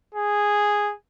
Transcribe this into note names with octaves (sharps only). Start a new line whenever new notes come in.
G#4